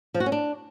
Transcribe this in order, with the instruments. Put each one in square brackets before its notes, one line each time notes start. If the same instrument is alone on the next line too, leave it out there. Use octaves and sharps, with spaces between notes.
[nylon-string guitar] F3
F#4
C#4
D4